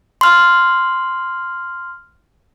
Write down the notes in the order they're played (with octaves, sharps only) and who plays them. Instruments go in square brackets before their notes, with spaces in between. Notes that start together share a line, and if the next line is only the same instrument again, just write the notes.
[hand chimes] C6 F6